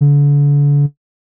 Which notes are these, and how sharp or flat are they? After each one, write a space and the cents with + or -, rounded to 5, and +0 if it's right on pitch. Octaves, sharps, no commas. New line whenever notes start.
D3 -35